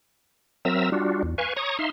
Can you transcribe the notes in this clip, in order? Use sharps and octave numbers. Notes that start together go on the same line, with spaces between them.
F#3 C4 A#4 E5 A#5 E6
G3 D4 F4 F#4
E2
B4 F5 G#5 C#6
C#5 A#5 C#6 D#6
D#4 E5 F5 C6